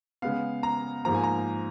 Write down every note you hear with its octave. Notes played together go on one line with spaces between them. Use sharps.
C#3 G#3 B3 F5
A#5
G#2 F3 A#3 A#5
G#5
A#5